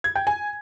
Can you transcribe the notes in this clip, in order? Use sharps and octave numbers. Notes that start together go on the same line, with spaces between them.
G#6
G5
G#5